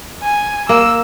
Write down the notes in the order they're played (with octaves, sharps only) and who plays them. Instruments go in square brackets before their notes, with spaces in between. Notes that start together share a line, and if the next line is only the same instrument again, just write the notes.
[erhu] G#5
[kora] A#3 [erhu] E6